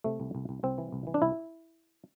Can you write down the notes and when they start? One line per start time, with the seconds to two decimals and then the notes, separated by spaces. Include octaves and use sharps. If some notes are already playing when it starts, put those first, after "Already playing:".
0.04 C3 A3
0.20 C2
0.35 C2
0.49 C2
0.63 C2 C4
0.78 E3
0.92 C2
1.07 E3
1.14 D4
1.22 C2 E4